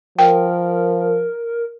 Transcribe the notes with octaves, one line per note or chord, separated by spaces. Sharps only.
F3 A#4 G5